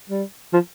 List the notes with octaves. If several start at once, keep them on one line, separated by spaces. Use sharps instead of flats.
G3
F3